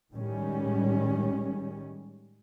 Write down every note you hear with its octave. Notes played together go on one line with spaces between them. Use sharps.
A2 D#3 G3 G#3 C#4